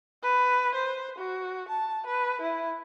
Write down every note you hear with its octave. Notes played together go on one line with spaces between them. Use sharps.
B4
C5
F#4
A5
B4
E4